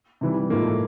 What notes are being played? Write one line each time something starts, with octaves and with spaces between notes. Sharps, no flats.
C3 E3 G3
A2 F3 G#3 A#3
A3